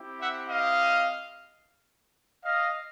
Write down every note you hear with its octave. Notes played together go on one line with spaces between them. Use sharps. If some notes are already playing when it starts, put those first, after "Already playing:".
Already playing: C4 E4 G4
E5 F#5
D#5 F5
D#5 F5